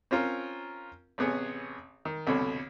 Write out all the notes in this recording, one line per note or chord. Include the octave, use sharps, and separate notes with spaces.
C4 C#4 F4 A#4
A1 C3 B3 G#4 C#5
D#3
C2 F2 B2 D3 C#5 B5